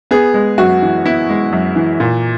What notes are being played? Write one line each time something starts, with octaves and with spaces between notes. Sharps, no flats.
B3 G#4
G#3
F#2 F#4
E3
B3 E4
G#3
F#2
E3
A#2